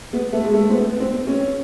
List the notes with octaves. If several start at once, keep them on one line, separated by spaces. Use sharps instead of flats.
B3
A3
G#3
A3
C4
B3
C4
C#4